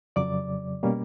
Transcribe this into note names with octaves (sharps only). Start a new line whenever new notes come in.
F2 C#3 F#3 D5 D6
B2 G3 A#3 C#4